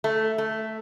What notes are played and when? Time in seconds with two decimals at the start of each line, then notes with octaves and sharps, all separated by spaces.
0.04 A3
0.38 A3